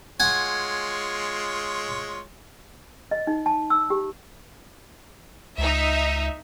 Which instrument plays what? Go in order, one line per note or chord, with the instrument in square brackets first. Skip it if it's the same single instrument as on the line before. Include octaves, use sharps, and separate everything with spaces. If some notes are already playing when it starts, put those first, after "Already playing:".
[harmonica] G#3 F4 C#5 [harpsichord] F#5 G#5
[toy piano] D#5
D#4
A5
E6
G4
[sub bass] C#2 [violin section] D#4 E5